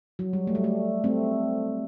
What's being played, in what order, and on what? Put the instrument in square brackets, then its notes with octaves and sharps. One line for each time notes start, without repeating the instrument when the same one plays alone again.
[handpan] F#3
G3
A3
G3
A3
A3 C4